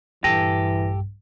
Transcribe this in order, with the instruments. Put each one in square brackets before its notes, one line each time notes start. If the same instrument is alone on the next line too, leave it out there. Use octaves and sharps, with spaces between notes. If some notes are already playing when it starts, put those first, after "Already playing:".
[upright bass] A#1 G2 [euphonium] E3 [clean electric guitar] G4 A4 [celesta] A#6 D#7